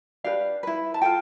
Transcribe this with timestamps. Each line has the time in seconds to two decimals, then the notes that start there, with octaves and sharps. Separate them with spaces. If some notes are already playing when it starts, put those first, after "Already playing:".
0.24 D4 G4 B4 F5
0.63 E4 B4
0.94 A5
1.02 F4 A4 G5